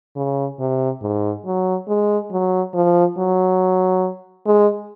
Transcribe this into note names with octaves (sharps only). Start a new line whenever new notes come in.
C#3
C3
G#2
F#3
G#3
F#3
F3
F#3
G#3